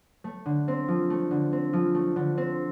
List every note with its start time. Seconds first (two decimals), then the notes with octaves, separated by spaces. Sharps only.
0.24 A3
0.46 D3
0.68 C4
0.88 F3
1.10 A3
1.31 D3
1.53 C4
1.73 F3
1.95 A3
2.16 D3
2.38 C4